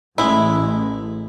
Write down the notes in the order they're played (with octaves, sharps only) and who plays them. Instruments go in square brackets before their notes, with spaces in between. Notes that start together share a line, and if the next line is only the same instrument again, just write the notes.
[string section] A1 [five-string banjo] G#3 E4